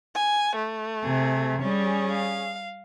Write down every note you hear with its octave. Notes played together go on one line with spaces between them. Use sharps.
G#5
A3
C3 G#4
G3 C#4 G#4
F5